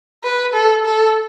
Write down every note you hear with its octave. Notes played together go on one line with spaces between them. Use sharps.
B4
A4
A4